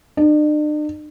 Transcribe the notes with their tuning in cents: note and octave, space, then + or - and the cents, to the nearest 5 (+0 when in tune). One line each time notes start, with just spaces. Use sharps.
D4 +45